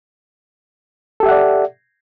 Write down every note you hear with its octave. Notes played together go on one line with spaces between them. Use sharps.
G4 A4 D5 E5 F#5